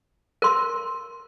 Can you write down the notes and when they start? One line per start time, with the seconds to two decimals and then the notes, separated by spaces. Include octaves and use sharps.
0.42 A#4 C6